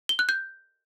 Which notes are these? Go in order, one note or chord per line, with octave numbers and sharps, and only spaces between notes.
G7
F#6
G6